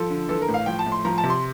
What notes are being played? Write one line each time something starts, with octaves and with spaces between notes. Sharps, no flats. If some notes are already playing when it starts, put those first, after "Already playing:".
Already playing: F3 A4
D3
E3 A4
A#4
A2
F5
F3 G5
A5
A2
C6
F3 A#5
A5
C3
C6